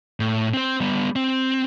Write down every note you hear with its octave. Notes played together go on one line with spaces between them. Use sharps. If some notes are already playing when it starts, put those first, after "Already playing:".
A2
C4 C5
G3 B3
C4